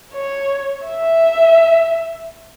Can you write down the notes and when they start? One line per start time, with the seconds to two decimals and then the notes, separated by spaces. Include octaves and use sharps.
0.13 C#5
0.86 E5